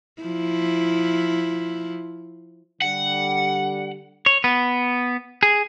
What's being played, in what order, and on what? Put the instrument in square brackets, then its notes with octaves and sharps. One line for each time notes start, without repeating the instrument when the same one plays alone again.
[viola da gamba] F3 E4
[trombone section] D3 G3 [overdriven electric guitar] F#5
[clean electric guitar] C#5
B3
G#4